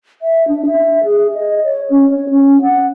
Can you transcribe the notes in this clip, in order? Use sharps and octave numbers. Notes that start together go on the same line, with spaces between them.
E5
D4
E5
G#4
D#5
C#5
C#4
C#5
C#4
F#5